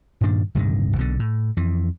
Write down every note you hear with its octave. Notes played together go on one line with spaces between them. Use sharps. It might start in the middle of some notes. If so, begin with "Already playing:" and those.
G2 A#2 D#3 D4
D1 G2 C3 D#3
B1 B2 D3
A2
F2 E3